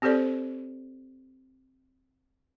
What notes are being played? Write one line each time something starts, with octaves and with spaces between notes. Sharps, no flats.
C4 G4 A4 C5 D5